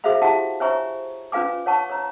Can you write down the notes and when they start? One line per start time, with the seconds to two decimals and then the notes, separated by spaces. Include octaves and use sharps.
0.04 F#4 G#4 C5 E5 F5 B5
0.22 E4 F#4 G4 E5 F#5 A5
0.60 C5 C#5 E5 G#5 A#5 C#6
1.32 C#4 F4 B4 F5 G#5 D6
1.66 C#5 F#5 A5 C#6
1.90 C#5 A#5